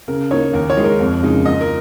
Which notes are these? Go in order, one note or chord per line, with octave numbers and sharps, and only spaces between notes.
C#3 A#4
A#3 D#4 C#5
D#2 A#4
C#5
D#3 G#3 D#4
A#4
F2
C#3 G#3 D#4
A#2 D#5
A#4